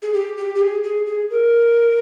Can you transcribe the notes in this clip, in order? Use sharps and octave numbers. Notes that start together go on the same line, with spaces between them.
G#4
G4
G4
G4
G#4
G#4
G#4
A#4